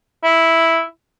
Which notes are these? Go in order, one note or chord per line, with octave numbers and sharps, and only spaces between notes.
E4